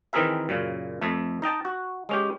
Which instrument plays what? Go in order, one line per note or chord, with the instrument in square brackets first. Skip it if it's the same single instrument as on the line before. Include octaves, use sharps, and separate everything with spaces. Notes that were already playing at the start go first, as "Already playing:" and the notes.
[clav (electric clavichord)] D#3 E3 C4 G#4 A#4 E5
F#2 A#2 C#3
F2 A3
D#4 D#5 G5 A5
F#4
G#3 C#4 G4